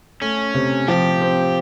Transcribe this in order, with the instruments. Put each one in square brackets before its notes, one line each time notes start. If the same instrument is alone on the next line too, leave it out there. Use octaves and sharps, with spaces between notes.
[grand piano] A3 [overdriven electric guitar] C#4
[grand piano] C3
[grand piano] F3 [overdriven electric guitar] G4
[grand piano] C4